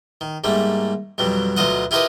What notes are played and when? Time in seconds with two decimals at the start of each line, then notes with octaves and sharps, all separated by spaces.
0.21 D#3
0.44 G#2 G3 A3 A#3
1.18 F2 B2 F#3 G3
1.56 D2 B2 F#3 F4 D#5 F#5
1.91 E4 F4 G4 A#4 B4 D#5